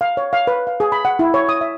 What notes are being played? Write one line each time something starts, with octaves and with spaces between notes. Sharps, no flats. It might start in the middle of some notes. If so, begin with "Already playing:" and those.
F5
C#5
F5
B4
F5
G#4
B5
F#5
E4
C#5
D#6
E5